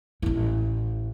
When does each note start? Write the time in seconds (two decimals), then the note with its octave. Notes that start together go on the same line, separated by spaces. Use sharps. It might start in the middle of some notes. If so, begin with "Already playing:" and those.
0.22 A1 E4